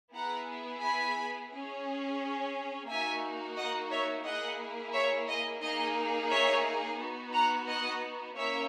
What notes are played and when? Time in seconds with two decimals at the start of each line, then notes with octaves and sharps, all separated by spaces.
0.14 B3 E4 G#4 F#5 A#5
0.83 G#5 B5
1.52 C#4 G#4
2.88 A#3 D#4 F#4 E5 G#5
3.56 D#5 F#5
3.91 C#5 E5
4.25 A#3 E4 G#4 D#5 F#5
4.94 C#5 E5
5.28 D#5
5.62 A#3 D#4 G#4 D#5
6.31 C#5 E5
6.99 B3 D#4 F#4
7.33 F#5 A#5
7.68 D#5 F#5
8.36 A#3 C#4 E4 C#5 E5